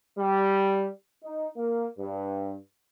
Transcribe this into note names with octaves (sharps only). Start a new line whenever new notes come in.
G3
D#4
A#3
G2